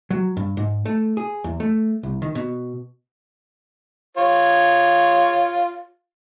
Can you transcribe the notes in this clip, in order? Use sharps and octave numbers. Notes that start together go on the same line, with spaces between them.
F#3
G2
G#2
A3
G#4
E2
A3
C2
D#3
B2
F4 C#5